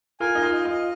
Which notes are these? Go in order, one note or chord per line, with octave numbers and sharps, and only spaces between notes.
F4 A#4 G#5
D#4 D#5
F4
D#5
F4 D#5